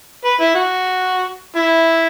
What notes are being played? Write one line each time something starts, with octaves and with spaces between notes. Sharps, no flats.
B4
E4
F#4
E4